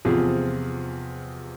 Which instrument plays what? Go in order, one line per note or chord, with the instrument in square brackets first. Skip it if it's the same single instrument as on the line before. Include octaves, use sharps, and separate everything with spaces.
[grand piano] E2 C3 F3 F4 G#4